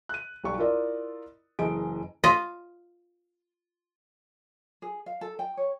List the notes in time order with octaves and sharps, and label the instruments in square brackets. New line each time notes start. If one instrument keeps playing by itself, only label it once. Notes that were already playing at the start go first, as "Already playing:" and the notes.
[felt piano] F#6 D#7
B1 G3 C#6
E4 F4 A#4 D5 D#5
F#1 E3 G#4 D#5 D7
[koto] F4 D#5
[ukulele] G#4
F5
A4
G5
C#5